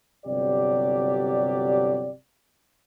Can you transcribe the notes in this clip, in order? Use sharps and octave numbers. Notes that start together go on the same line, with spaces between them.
G1 C3 F#3 G4 D5